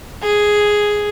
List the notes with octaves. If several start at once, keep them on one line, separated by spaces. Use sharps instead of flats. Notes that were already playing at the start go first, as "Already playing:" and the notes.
G#4